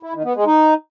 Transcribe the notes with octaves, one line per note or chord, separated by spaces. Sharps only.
E4
D#3
B3
G#3
D#4